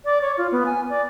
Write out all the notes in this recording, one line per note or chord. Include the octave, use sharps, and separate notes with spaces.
D5
C#5
F4
B3
G#5
D5